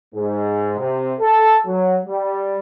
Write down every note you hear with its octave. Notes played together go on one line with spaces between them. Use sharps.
G#2
C3
A4
F#3
G3